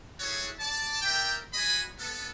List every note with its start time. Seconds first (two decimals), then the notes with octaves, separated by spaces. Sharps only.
0.20 E4 F#4 G#4 A4 C#5
0.60 D5 A5
1.02 A#4 D5 E5 G5
1.54 F#4 D#5 G#5 B5
1.99 B3 A4